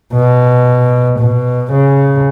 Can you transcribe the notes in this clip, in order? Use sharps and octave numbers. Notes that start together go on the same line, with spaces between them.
B2
B2
C#3